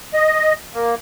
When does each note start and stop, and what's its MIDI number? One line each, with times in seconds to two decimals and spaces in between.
0.14 0.53 75
0.75 0.95 58